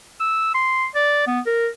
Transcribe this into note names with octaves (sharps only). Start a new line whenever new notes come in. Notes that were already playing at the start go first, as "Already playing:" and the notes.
E6
C6
D5
B3
A#4